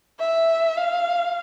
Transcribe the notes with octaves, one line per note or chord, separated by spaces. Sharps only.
E5
F5